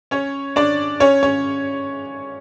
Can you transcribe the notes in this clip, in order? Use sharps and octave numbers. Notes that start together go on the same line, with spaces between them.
C#4 C#5
D4 D5
C#4 C#5
C#4 C#5